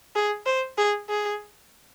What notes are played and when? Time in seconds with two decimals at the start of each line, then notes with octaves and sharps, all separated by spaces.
0.15 G#4
0.46 C5
0.78 G#4
1.09 G#4